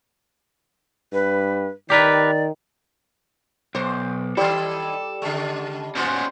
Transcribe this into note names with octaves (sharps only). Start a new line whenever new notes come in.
G2 B4
D#3 G4 A#4 B4 D5
B1 C5 D6
D#3 G3 D#4 A4 D5
C#3 G#3
A2 C#4 F4 F#4 C5